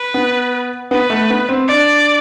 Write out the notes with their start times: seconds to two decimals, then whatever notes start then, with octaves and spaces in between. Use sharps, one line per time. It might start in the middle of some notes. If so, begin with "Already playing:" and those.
Already playing: B4
0.14 B3
0.91 B3 B4
1.10 A3
1.30 B3
1.49 C4
1.68 D4 D5